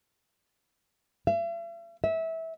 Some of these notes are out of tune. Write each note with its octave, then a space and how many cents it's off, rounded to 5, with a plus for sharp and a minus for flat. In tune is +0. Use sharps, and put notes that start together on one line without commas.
E5 +45
E5 -20